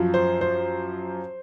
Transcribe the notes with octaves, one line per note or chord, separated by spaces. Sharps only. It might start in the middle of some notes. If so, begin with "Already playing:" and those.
Already playing: F#2 F3
C5
C5